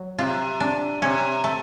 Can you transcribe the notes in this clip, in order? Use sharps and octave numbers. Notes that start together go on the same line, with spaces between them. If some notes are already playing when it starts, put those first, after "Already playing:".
Already playing: F#3
C3 F4
D4
C3 C#4
A3